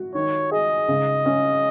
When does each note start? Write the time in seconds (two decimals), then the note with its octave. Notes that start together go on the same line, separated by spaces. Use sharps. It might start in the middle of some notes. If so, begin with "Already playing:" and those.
Already playing: F#4
0.14 D#3 C#5
0.52 G#4 D#5
0.88 C#3
1.26 C#4